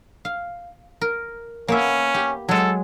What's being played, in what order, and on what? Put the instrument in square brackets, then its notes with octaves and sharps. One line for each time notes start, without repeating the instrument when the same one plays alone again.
[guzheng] F5
A#4
[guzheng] A#3 B3 E5 [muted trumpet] C#4
[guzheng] G4
[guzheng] F#3 G#3 [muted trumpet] A4